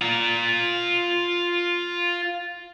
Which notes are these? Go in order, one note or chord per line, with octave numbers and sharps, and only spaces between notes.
F4 A#5